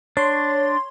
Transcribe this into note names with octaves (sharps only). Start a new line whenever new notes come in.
D4 C#5 C6